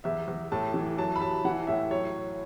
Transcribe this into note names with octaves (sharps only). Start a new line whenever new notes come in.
E2 E5
E2
A2 A5
E3
F#3 A5
B5
F#3 A5
E3 F#5
A2 E5
F#3 C#5